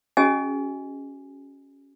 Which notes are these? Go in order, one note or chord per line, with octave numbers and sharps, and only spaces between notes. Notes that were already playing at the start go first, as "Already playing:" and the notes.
C#4 F#4 G#4 D#5 G#5